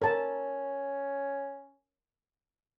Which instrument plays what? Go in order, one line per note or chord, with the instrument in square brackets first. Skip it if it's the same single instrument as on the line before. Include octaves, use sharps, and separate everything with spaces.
[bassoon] C#4 [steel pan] A#4 A5